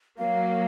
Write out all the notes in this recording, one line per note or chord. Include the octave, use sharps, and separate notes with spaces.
F#3 A#3 F5